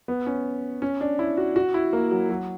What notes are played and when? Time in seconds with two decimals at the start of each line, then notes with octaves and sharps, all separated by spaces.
0.08 B3
0.26 C#4
0.82 C#4
1.01 D4
1.19 E4
1.37 F#4
1.56 F#4
1.74 E4
1.93 A#3
2.11 F#3
2.30 F#3